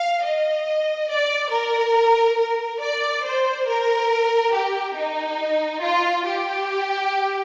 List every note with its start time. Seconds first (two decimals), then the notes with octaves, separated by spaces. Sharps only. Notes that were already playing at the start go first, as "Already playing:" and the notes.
Already playing: F5
0.23 D#5
1.09 D5
1.51 A#4
2.37 A#4
2.80 D5
3.24 C5
3.67 A#4
4.52 G4
4.95 D#4
5.81 F4
6.24 G4